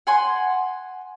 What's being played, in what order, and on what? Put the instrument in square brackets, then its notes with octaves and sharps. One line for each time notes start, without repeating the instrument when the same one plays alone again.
[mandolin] F#5 G#5 C6